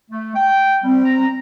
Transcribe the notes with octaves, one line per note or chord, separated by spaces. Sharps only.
A3
G5
G3 C4
A#5